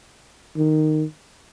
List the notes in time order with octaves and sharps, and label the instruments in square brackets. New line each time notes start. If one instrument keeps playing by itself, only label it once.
[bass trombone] D#3